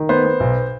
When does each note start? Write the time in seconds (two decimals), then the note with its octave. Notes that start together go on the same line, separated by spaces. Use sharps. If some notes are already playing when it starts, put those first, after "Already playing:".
Already playing: D#3
0.09 B3 C5
0.25 B3
0.40 B1